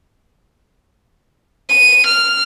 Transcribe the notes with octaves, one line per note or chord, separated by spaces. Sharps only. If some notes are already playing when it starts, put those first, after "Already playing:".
D#7
F6